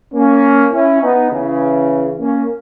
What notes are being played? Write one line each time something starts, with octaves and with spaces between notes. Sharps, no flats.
A#3 C#4
C#4 E4
B3 D#4
C#3 E3
A#3 C#4